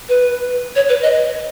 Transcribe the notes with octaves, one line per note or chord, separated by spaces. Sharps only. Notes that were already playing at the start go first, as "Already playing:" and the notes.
B4
C#5
B4
D#5